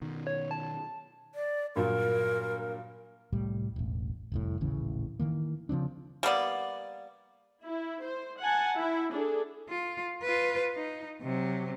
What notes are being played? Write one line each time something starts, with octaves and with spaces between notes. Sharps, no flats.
B2 D#3
C#5
A5
D5
G2 A#2 F#3 A#4
C2 A2 G3
E1 A1
F1 C2 A2
D#1 A1 C#3 E3
D#3 E3 A#3
C#3 F3 C4 D4
G3 A#3 B3 D5
E4
C5
F#5 G#5 A5
E4
D4 G#4 A4
F4
F4 B4
D#4
C3 F#3